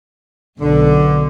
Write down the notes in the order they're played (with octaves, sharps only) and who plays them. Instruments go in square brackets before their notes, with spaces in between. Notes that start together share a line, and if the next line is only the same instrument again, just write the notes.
[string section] B1 F#2 B2 [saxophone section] D3